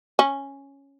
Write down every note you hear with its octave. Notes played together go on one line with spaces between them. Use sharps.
C#4